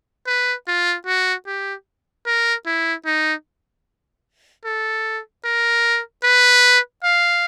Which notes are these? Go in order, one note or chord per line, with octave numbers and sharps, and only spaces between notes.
B4
F4
F#4
G4
A#4
E4
D#4
A4
A#4
B4
F5